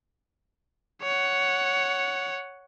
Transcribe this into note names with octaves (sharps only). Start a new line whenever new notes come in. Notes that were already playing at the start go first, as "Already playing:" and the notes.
C#5 F#5